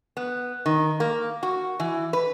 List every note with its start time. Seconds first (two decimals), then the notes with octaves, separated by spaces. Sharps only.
0.17 B3
0.66 D#3
1.00 A#3
1.43 F#4
1.80 E3
2.13 B4